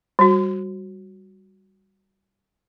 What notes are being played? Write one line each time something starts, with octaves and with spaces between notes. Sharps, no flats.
G3 F#4